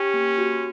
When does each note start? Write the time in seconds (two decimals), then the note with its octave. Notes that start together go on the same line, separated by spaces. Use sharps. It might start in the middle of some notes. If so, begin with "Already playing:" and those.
Already playing: C#4 G4
0.14 A#3
0.38 F#4